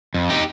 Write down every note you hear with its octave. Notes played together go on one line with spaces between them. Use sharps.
F2
D#4 G4